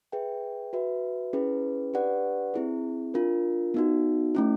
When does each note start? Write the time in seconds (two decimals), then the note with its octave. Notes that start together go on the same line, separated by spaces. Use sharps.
0.12 G#4 B4 E5 G5
0.73 F#4 B4 E5
1.33 C#4 E4 G#4 B4
1.93 D4 G4 B4 D5 F#5
2.54 C4 E4 G#4
3.14 D4 F4 A#4
3.74 B3 D#4 F#4
4.35 A3 C#4 E4